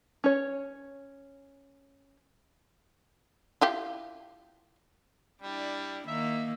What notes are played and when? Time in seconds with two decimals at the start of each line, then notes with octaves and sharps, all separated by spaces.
0.24 C#4 C#5
3.61 E4 F4 G4
5.42 G3 D4 E4
6.07 D#3 A#3 E5